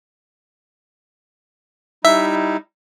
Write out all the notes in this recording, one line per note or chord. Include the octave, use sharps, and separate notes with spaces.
G3 D#4 E4 E5